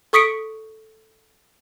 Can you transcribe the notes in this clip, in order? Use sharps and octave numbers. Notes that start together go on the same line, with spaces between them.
A4 C#6 D#6 B6 C#7 D7